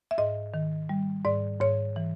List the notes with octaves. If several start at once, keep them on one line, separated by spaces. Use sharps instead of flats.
E5
G#2 D#5
D#3
G3
G#2 D5
G#2 C#5
E3